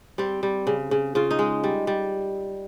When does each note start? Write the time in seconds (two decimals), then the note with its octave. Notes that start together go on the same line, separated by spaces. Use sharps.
0.18 G3 C4
0.43 G3
0.67 C#3
0.91 C#3
1.15 C#3 F4
1.31 D#4
1.39 G#3
1.64 G3
1.87 G3